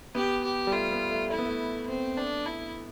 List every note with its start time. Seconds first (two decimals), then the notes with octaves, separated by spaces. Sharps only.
0.15 B3 G4
0.43 G4
0.67 G3
0.72 A3 F4
0.92 B3
1.11 A3
1.30 A3 E4
1.38 B3
1.46 A3
1.88 C4
2.17 D4
2.46 E4